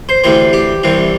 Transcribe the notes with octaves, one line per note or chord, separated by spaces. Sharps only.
C5
D2 C3 E3 C4 C5
G4
C2 C3 E3 C4